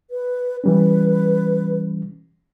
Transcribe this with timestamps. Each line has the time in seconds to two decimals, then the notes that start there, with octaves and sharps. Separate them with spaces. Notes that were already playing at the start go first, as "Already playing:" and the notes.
0.10 B4
0.64 E3 G3 C#4 B4